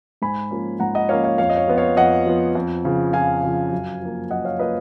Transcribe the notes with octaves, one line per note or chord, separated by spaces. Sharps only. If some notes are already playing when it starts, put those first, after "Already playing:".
G#2 G#5 B5
F3 A#3 C#4
G#2 F#5 A#5
D#5 F#5
F3 A#3 C#4 C#5 F5
C#5 F5
F2 C#5 F5
D#5
C#5
F3 B3
C#5 F5
F2 D#5 F#5
F3 B3
F2
C#3 F3
F2 F5 G#5
C#3 F3
F#2
F3 A#3
F#2 D#5 F#5
C#5 F5
F3 A#3 B4 D#5